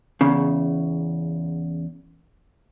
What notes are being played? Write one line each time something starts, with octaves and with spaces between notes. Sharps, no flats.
E2 C#3